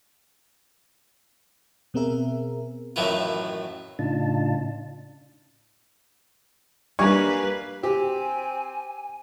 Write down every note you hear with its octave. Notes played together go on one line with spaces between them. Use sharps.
B2 B3 C4 G#4 A#4 E5
F#2 A2 D#3 E3 E4 F4
A2 C#3 D4 D#4 F4 A5
G3 A#3 D4 B4 G#5 C#6
C4 G4 G#5